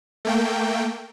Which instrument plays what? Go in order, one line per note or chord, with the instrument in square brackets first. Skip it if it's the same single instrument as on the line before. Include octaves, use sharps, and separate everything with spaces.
[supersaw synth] A3 A#3 G5